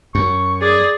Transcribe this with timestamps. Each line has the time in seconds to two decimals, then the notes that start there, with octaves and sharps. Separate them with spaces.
0.15 F#2 C#6
0.62 G#4 D5